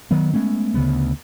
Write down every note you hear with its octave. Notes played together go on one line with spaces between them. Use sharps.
D#3 F#3 B3
G#3 A3 B3 C#4
D2 C#3 A3 B3